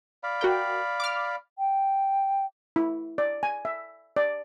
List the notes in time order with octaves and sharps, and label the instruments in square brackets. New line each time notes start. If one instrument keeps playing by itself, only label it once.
[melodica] D5 F5 B5
[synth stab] F#4 A#4 G5
D6 F6
[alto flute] G5
[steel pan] E4
D5
G#5
E5
D5